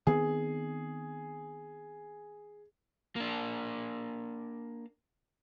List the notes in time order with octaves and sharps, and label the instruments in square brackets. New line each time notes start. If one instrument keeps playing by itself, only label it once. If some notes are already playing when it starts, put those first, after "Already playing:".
[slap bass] D#3 B3 C4 [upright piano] G#4
[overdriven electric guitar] A#3 D4